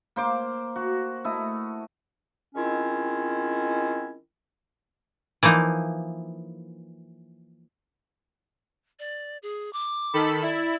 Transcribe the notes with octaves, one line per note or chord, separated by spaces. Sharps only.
A#3 C5 D6
F#4
A3 E4 D#5
D#3 G#3 C4 C#4 E4 F4
E3 F3 A#3 D#4
D5
G#4
D6
D#3 A4 B5
E4 D5